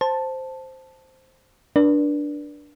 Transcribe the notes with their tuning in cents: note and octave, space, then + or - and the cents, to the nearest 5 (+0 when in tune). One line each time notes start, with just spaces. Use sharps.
C5 +0 A5 +0
D4 +0 B4 -40 D5 -10